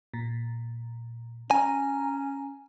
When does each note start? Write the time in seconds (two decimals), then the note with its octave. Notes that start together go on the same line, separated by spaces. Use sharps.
0.14 A#2
1.51 C#4 G#5 A#5